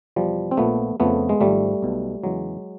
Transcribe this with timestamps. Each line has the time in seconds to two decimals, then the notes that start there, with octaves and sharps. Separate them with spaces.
0.16 E2 B2 F3 G3
0.51 C4
0.57 A#1 A#2 F3 A3 B3
1.00 F2 C#3 F3 A3 B3
1.29 G#3
1.40 G#1 G#2 F3 G3 A3
1.83 B1 B2
2.24 E2 C#3 E3 F#3 G#3